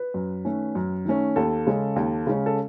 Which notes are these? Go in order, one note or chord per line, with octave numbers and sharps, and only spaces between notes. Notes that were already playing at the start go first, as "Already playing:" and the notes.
Already playing: B4
F#2
D#3 A3 C#4
F#2
D#3 A3 C#4
D#2 A4
C#3 G#3 C#4
D#2
C#3 G#3 C#4
A4